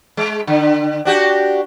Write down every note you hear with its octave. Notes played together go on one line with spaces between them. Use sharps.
G#3
D3
D4 F#4 G4